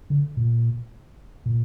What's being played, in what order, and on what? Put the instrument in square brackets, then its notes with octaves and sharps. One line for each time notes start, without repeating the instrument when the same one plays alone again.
[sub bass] D3
A#2
A#2